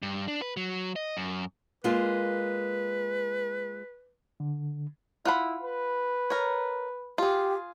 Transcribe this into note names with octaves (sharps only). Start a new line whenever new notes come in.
G2
D4
B4
F#3
D#5
F#2
G#3 A#3 F4 B4
D3
E4 F4 F#5 B5
B4
A#4 C#5
F4 G4 G#4